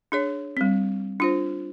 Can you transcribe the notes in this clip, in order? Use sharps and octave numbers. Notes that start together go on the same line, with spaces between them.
D4 G#4 C#5
G3 C4
D4 F4 C5